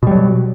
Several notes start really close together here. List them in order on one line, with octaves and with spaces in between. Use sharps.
B2 G3 F#3